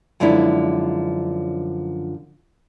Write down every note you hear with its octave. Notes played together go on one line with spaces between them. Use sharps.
F#2 D3 F3 G#3 D4 E4